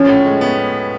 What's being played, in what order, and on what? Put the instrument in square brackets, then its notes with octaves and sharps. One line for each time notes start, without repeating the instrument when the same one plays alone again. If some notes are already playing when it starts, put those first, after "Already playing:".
Already playing: [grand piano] F3 [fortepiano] C#4
[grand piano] A2
G#3
B3